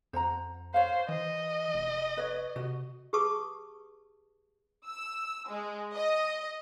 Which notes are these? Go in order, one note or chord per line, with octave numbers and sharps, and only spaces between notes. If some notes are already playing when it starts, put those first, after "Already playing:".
F2 C5 F#5 A#5
C5 C#5 F5
E3 D#5
F1
B4 C#5
C3 F#4
G4 G#4 B4 A5 C#6 D#6
E6
G#3
D#5